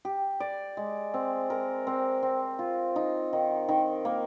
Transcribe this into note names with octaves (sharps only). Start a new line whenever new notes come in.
G4
D5
G#3
C4
A#4
C4
C4
F4
D#4
D#3
D#3
A#3